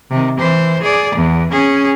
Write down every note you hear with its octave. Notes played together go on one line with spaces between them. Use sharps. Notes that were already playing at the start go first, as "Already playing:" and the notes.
C3 D#3
E3 C5
G#4 D5
E2
C#4 G#4